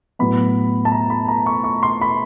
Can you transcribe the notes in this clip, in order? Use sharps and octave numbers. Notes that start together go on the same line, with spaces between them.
A2 F#3 B3 B5
A5
A#5
B5
A#5
C#6
C#6
C6
B5